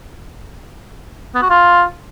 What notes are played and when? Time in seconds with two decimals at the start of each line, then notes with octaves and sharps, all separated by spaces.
1.35 B3
1.42 F#4
1.50 F4